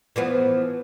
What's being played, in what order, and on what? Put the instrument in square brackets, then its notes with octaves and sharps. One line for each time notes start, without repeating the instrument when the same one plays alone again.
[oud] E3 F3 B3